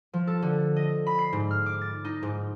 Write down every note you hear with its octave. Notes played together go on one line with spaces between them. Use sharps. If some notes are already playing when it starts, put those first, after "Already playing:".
F3
A4
D3
D#5
B5
C7
G#2
F6
D6
A6
D#4
G#2